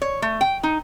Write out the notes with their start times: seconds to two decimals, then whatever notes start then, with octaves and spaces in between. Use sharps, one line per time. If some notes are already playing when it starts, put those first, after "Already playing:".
0.02 C#5
0.22 A3
0.41 G5
0.63 D#4